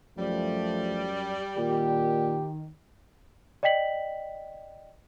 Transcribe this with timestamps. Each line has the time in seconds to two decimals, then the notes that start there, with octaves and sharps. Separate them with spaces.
0.18 F#2 F3 G3 A3
1.58 A#2 D#3 G4
3.63 D5 D#5 G5 B6 F#7